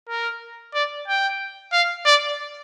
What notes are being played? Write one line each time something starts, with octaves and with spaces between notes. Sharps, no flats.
A#4
D5
G5
F5
D5